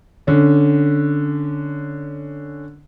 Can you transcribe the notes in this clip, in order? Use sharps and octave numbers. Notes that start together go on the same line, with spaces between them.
D3 C#4